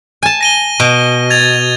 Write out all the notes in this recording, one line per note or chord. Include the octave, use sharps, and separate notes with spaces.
G#5 A5
A#6 D#7 G7
B2
G#6 A6 F7